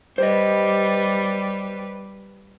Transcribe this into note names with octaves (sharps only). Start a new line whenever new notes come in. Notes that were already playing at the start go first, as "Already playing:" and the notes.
G3 B4 C5 D#5